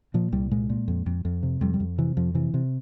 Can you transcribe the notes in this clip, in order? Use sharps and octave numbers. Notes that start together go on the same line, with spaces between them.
A#2 F3
C2 G3
A#2 G#3
A#2
F2
F2
F2
C3
F2 G3
G3
F2
C3 E3
F2 F3
C3 E3
C3